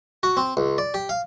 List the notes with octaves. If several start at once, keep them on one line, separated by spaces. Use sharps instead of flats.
F#4
C4
C#2
D5
G4
F5